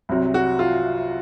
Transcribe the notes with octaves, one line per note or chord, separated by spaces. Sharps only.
C2 C3 F#3
F#4
F4